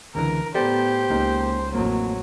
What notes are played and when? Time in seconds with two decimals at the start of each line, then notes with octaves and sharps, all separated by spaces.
0.15 C#2 D3 E3 A#4
0.55 A2 B3 G4 A4 C5 D5
1.10 C#2 A#3 D#4
1.74 A1 F2 F#3 A#3